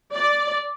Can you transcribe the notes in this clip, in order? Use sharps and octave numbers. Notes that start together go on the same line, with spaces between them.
D5